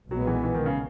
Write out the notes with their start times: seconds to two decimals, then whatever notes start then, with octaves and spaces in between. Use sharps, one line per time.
0.11 B1 A#2 F#3 G#3 B3
0.27 E3
0.44 E3
0.54 D#3
0.66 C#3